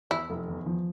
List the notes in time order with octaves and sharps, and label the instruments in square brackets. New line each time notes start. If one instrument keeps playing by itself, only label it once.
[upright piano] E2 [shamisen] E4
[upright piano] F1
E2
F3